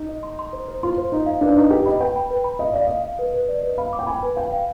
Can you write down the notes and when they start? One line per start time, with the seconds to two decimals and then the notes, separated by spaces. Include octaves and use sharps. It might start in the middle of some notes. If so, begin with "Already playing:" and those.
Already playing: D#4
0.09 D#5
0.23 C6
0.39 C6
0.53 C5
0.68 C5
0.83 F4 C6
0.98 C5
1.12 D#4 C5
1.26 F5
1.41 D4 B4
1.56 D#4 B4
1.71 G4 B4
1.86 D#5 B5
2.01 B4 G5
2.16 B5
2.31 B4
2.44 B5
2.59 D#5 F5
2.74 D5 F5
2.87 D#5 F5
3.05 F5
3.19 B4
3.34 B4
3.49 D5
3.63 B4
3.78 F5 B5
3.93 D6
3.99 G5
4.07 G#5 B5
4.23 B4
4.36 F5 G5
4.52 F5